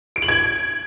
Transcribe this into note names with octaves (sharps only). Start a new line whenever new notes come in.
D7
F#7
G#6